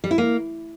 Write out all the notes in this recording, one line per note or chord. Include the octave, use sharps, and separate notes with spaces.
G3
E4
A#3